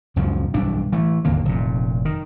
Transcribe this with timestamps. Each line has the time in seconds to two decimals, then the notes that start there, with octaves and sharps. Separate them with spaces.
0.16 C#2 F#2 B2 F3
0.54 B1 G2 E3 D4
0.92 E3 A3
1.25 G#1 D#2 D3 A#3
1.45 F1 A#2
2.05 D#3